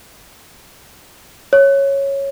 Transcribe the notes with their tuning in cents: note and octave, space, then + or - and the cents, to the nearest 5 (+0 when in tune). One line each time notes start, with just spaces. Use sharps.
C#5 -5